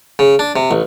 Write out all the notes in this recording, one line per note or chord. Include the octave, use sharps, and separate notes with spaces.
C#3
D4
C3
A1